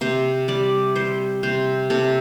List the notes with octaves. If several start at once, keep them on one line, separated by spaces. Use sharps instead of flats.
C3 C5
G3 D5
G3 C5
C3 C5
C3 A4